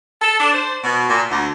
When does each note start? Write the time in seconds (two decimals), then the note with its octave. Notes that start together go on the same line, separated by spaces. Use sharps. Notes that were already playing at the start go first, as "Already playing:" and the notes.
0.21 A4
0.39 D4
0.53 C5
0.84 B2
1.09 A#2
1.30 D2